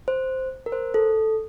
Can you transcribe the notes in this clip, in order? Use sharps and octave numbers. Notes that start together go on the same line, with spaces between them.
C5
A#4
C5
A4